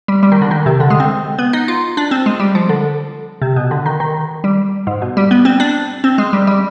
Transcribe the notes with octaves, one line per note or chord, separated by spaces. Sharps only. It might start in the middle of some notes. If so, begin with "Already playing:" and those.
G3
G3
D#3
D3
D#3
C3
D3
G#3
C4
B3
D#4
F4
D4
C4
G#3
G3
F3
D3
C3
B2
D3
D#3
D#3
G3
G#2
B2
G3
B3
C4
D4
C4
G#3
G3
G3